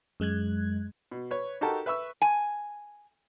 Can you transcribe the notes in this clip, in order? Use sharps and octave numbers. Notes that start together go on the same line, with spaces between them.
F#2 G#3 F#6 G#6
B2
B4 C#5
D#4 F#4 G4 A4 A#4 A5
B4 E5 B5 C#6 E6
G#5